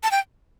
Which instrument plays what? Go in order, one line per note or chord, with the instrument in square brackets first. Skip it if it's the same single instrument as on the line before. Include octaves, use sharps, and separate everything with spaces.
[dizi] A5
G5